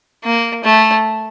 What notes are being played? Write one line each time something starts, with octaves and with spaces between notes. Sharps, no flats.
A#3
A3